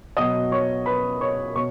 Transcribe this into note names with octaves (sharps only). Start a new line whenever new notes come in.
B2 F#3 D#5 D#6
C#5 C#6
B4 B5
C#5 C#6
B2 C#5 C#6